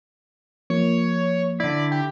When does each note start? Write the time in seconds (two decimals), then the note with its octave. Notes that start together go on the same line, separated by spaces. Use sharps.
0.70 F3 A#3 C#5
1.60 D3 E4 D5
1.92 G4